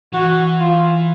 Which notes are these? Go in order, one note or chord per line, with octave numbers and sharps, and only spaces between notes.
E3 F#4
F4